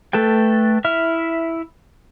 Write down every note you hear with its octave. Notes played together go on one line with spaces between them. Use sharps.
A3 A4 B4 G5
E4 E5 F6